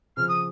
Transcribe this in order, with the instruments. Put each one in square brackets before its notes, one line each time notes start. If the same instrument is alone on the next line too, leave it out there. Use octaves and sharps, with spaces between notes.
[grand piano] C#3 F3 [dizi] F6
[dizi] D#6